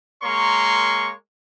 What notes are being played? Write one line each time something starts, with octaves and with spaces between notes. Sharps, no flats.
G#3 A#3 A#4 C#5 C6 C#6